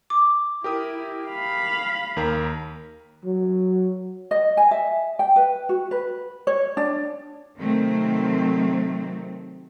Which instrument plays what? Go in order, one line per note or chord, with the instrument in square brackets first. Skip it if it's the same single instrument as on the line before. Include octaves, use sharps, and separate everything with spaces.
[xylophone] D6
[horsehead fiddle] E4 [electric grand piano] G4 A#4 D#6
[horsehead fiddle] F5 B5
[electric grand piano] D#2 A#4 A#5
[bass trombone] F#3
[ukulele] D#5
G#5
E5
G5
B4
F#4
B4
C#5
D4
[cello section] C3 D#3 F#3 A3 C4